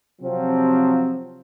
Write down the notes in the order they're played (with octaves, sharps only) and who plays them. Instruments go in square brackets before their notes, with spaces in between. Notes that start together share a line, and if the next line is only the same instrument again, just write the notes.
[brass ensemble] C3 F3 F#3 C4